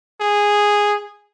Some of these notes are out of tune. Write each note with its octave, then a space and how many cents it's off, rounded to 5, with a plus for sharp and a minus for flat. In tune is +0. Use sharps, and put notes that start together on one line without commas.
G#4 -10